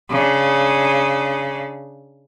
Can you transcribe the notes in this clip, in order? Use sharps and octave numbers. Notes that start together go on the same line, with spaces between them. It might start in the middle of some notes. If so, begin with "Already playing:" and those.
C#3 D4